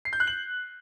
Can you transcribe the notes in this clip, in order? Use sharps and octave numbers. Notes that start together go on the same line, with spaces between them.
C7
G6
F#6
F#7